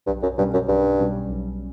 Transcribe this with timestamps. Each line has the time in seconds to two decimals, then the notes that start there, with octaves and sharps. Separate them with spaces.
0.07 B1 G2
0.23 F#2
0.38 G2 B2 G3 C#4
0.53 F#2
0.68 B1 G2
0.99 B2 G3 C#4
1.29 B1